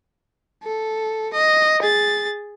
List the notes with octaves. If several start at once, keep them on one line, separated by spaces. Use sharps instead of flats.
A4
D#5
G#4 A6